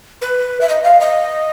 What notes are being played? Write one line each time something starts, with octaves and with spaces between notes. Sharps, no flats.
B4
E5
D#5
F5
D#5